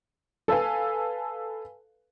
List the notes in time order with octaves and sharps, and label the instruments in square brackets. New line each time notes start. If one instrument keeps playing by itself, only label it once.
[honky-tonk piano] A4 B4 F5 G#5